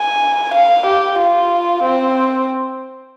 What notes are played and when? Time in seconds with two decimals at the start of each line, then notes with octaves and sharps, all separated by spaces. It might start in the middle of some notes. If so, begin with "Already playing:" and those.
Already playing: G#5
0.55 F5
0.87 G4
1.19 F4
1.84 C4